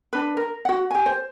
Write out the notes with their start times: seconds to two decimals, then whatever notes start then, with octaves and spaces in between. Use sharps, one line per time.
0.13 D4 B4
0.37 A#4
0.65 F#4 F#5
0.90 G4 G#5
1.06 C5